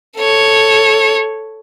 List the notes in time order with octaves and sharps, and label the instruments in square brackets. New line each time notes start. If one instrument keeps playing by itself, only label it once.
[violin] A4 C#5